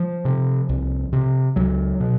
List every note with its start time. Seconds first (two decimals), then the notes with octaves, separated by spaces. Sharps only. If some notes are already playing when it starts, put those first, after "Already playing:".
Already playing: F3
0.25 C3
0.69 C2
1.13 C3
1.56 C#2 F#3
2.00 B2